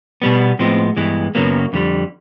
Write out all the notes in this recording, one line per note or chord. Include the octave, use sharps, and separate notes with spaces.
B2 G3 B3
A2 F3 G#3 B3 C4
G2 E3 G#3 B3
F#2 C#3 F#3 A#3 B3
F2 D3 G3